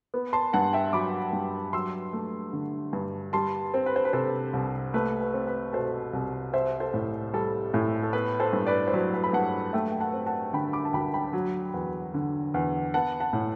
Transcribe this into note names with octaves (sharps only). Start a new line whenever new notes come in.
B3
A5 C6
G2 F#5 A5
E5 G5
F#3 B5 D6
G2
F#3 C6 E6
A3
D3
G2
G3 A5 C6
C4
B4
C5
B4
C3 A4 C5
C2
A3 B4
B4
C4
B4
B2 A4 C5
C2
C4 C5 E5
A4 C5
A2
G3 A4
A2
A4
B3 B4
A4 C5
G2
B4 D5
C5
F#3 B4
B4
B5
G2 F#5 A5
A3 E5 G5
G5
F#5 A5
C4
F#5 A5
D3 G5 B5
B5 D6
A5
D2 G5 B5
G5 B5
F#3
E2
D3
E2
B3 F#5 A5
F#5 A5
A2